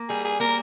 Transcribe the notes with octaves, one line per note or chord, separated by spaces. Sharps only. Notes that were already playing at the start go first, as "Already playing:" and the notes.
Already playing: A#3
G3 G#4
G#4
A#3 A#4